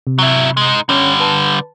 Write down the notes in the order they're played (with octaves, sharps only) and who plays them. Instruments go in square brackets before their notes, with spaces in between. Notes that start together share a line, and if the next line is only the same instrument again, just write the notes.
[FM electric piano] C3
[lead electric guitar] F#3 E4
G#3 D#4
[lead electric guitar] D3 G3 [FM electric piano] C#4 C#5
[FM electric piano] B4 A5